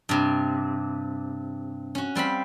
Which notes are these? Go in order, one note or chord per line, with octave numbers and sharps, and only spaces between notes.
G2 C3
C#4 F#4
G3 C4 F5 B5